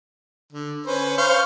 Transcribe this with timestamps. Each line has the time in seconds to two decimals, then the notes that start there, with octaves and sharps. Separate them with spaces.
0.53 D3
0.86 C#4 B4 C5
1.18 C5 F5 C#6